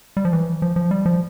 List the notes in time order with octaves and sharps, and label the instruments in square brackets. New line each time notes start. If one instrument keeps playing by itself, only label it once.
[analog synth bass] G3
F3
E3
F3
F3
G3
F3